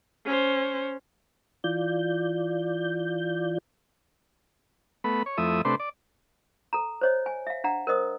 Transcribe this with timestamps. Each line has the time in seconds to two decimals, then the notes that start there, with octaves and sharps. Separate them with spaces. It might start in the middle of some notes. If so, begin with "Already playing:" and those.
0.25 C#4 C5
1.64 E3 F4 D5 G6
5.04 A3 B3 B5
5.26 C#5
5.37 F2 A3 E4 E5 D#6
5.65 C3 A3 D4 B4 C6
5.80 D5
6.73 A4 A#5
7.01 C5 C#5 D#5
7.26 G#5
7.47 E5 F5
7.64 D4 F5 F#5 A#5
7.87 A#4 C5 D#5 D#6